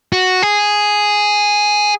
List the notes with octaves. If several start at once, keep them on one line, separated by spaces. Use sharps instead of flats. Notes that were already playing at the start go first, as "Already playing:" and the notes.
F#4
G#4